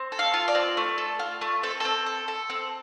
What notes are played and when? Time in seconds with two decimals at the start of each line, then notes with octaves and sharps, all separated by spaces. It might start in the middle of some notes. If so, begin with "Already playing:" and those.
Already playing: C4
0.12 A4
0.19 F5
0.34 F4
0.48 D5
0.55 C4
0.77 A3
0.98 A4
1.19 F4
1.41 A3
1.63 C4 A4
1.80 C4 A4
2.06 A4
2.28 A4
2.50 C4